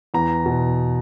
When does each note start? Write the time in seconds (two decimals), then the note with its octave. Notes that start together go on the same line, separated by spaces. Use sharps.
0.14 E2 A#5
0.46 B2